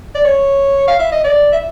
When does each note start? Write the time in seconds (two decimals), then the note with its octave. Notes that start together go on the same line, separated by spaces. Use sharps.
0.15 D5
0.25 C#5
0.88 F5
0.99 E5
1.12 D#5
1.24 D5
1.53 E5